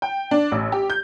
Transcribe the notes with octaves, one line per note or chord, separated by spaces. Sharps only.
G5
D4
A1
G4
G6